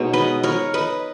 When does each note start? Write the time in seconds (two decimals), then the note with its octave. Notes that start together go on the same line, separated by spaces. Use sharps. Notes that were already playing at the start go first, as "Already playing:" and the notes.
Already playing: B2 G#3 D#4 C#5
0.13 B4 D#5
0.43 A#4 C#5
0.74 B4 D#5